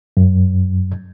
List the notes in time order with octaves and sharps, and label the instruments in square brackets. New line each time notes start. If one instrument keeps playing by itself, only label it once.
[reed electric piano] F#2